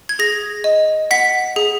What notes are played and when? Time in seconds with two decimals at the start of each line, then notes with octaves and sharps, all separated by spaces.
0.09 G#6
0.19 G#4 A#6
0.64 D#5
1.11 F#5 B6
1.56 G#4